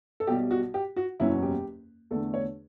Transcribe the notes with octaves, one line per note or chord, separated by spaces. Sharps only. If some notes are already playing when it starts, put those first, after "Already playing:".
A4
B1 B2 G3 G4
F#4
G4
F#4
F#1 E2 B2 F#3 C#4 E4
G4
E2 D3 A3 D4 A4
C#5